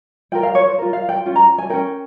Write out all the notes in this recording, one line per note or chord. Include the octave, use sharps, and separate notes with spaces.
F4 A#4 G5
F5
C#5
C5
F4 A#4
F5
G5
C#4 F4
A#5
G#5
C#4 F4 A#4 G5